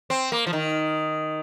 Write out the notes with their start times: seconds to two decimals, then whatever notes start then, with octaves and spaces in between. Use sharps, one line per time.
0.10 C4
0.32 A#3
0.47 F3
0.53 D#3